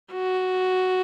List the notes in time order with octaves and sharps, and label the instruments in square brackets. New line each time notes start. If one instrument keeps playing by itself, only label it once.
[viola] F#4